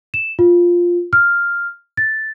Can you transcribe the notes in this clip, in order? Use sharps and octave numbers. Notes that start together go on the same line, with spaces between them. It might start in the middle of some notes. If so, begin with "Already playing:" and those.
E7
F4
F6
A6